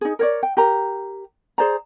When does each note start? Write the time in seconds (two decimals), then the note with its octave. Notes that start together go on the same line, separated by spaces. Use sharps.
0.01 D#4 G#4
0.19 A#4 C#5 D5
0.43 G5
0.57 G4 A#4 A#5
1.58 G#4 C5 D5 A#5